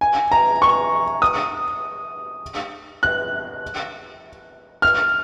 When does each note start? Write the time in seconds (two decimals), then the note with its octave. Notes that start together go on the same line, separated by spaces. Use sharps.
0.01 G#5
0.32 A#5
0.62 C#6
1.22 D#6
3.03 F#6
4.82 F6